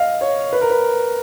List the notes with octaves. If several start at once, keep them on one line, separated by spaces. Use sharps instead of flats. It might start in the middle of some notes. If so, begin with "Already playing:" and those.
Already playing: D#5 F5
C#5
B4
A#4
B4